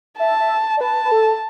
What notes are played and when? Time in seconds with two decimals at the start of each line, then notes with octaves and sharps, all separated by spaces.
0.19 E5 A5
0.40 E5
0.77 D5
0.81 B4 A5
1.05 B4
1.12 A4